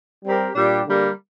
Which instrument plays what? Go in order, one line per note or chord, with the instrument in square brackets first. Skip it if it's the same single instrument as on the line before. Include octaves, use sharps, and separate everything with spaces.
[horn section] G3 C4 G4 A#4
A#2 G3 D4 G4
D3 G3 A#3